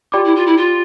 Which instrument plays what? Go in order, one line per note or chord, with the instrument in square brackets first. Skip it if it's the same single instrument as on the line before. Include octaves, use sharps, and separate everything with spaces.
[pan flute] F4 [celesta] G4 D5 G5 B5 D6
[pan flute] E4
F4
E4
F4